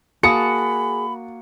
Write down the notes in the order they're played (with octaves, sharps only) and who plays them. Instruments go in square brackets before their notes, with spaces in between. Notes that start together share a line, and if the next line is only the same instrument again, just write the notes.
[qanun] A#3 F#4 A5 [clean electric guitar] G#4 [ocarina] B5 [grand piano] C#7